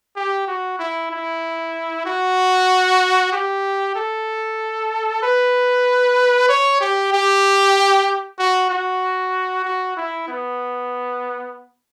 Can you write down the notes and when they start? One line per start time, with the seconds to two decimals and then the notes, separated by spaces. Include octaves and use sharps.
0.16 G4
0.48 F#4
0.79 E4
1.11 E4
2.06 F#4
3.32 G4
3.96 A4
5.23 B4
6.49 C#5
6.81 G4
7.12 G4
8.39 F#4
8.70 F#4
9.65 F#4
9.97 E4
10.28 B3